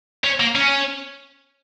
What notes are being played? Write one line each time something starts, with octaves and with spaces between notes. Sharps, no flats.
C#4
A#3
C#4